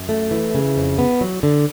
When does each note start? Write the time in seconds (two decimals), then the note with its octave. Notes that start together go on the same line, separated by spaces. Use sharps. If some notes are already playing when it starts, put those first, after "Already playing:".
Already playing: F#2
0.09 A3
0.31 E3
0.55 C#3
0.76 F2
0.99 B3
1.21 F#3
1.43 D3